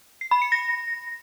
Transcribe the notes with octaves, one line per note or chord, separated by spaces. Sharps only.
C7
B5
C#7
A#6